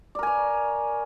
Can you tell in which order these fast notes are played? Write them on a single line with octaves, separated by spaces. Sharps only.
D5 A#4 G#5 C#5